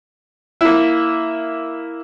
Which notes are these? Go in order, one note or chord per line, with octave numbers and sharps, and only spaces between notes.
A#3 E4